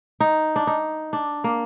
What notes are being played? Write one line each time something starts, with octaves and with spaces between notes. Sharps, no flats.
D#4
D4
D#4
D4
A#3